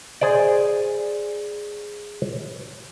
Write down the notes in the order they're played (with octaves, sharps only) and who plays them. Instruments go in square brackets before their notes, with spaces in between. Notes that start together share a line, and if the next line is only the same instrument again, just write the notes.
[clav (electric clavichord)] G#4 C5 D5